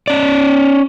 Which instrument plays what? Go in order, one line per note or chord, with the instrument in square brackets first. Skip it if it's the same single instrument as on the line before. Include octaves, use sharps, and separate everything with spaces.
[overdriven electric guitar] C#4 D5